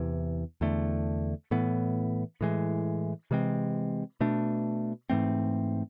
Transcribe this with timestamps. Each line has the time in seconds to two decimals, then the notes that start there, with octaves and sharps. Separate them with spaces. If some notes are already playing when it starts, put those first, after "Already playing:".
Already playing: E2 C3 E3
0.61 E2 D3 A3
1.51 A2 E3 B3
2.41 A2 E3 G#3
3.31 C3 E3 G#3 C4
4.20 B2 A3 D4
5.10 G#2 E3 A3 C4